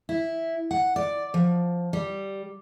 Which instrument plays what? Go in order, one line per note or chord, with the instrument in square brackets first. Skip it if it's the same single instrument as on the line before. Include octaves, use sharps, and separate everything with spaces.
[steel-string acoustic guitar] E4
F#5
D5
F3
G3